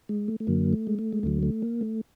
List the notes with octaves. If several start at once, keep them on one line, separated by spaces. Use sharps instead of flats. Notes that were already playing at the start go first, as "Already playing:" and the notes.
G#3
A3
A3
F#2 D3 F#3 A#3
A3
G#3
A3
G#3
D2 D3 F#3 A3
A3
A#3
A3